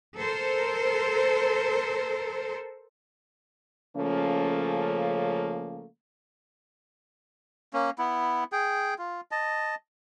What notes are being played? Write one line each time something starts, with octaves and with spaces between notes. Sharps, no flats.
A4 A#4 C5
C#3 F3 A3 A#3 C#4
A#3 C#4
B3 E4
G#4 G5
F4
D#5 A5